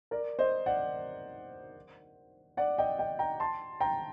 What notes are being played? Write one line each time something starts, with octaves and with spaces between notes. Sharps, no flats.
A#4 D5
C5 D#5
D5 F#5
D5 F#5
D#5 G5
D#5 G5
G5 A#5
A5 C6
G5 A#5